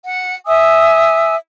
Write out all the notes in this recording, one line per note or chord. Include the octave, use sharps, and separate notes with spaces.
F#5
E5 G#5 D#6 E6